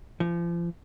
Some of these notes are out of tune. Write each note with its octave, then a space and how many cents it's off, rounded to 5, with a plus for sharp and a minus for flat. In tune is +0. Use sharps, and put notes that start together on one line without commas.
F3 -35